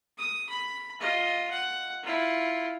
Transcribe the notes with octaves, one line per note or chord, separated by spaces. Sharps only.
D#6
B5
F4 D#5
F#5
E4 F4